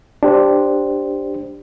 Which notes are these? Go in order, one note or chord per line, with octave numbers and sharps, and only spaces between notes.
D4 G4 C5